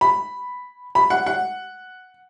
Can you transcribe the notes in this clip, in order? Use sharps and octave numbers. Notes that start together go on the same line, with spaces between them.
B5
B5
F#5
F#5